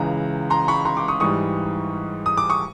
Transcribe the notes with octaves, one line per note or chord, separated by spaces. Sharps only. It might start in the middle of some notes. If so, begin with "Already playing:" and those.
Already playing: C#2 C#3 E3 A#5
A#5 C6
B5 C#6
A#5 C6
C6 D6
C#6 D#6
G#2 E3 G3 C#6 D#6
D#6
D6
C#6 D#6